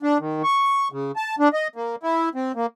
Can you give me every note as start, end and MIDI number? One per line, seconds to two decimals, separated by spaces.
0.03 0.18 62
0.20 0.42 51
0.43 0.88 85
0.92 1.12 49
1.16 1.35 81
1.39 1.49 62
1.53 1.68 75
1.76 1.96 58
2.03 2.29 64
2.35 2.52 60
2.56 2.66 58